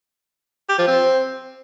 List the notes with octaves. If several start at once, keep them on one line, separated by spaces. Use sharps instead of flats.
G4
F3
C4